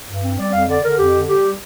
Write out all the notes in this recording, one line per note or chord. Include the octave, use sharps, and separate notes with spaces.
G2
C4
G3 D5
F2 F5
D3 D5
D3 A#4
F2 G4
D3
G3 G4